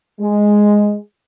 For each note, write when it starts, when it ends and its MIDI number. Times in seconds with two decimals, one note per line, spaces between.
0.21 0.96 56